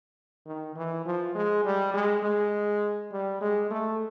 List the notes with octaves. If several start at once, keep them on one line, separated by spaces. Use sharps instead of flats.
D#3
E3
F3
G#3
G3
G#3
G#3
G3
G#3
A3